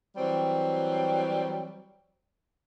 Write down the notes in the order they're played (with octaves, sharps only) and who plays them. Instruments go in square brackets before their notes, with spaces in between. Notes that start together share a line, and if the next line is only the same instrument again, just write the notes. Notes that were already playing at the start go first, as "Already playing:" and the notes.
[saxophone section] E3 F#3 G3 C4